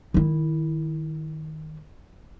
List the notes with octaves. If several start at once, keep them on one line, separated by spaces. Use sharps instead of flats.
D#3 E4